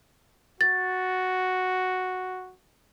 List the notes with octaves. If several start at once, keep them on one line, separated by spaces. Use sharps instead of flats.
F#4 A6